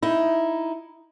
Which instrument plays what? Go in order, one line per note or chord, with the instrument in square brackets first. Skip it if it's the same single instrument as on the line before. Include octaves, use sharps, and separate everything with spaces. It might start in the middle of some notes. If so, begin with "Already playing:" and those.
[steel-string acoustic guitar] D#4 E4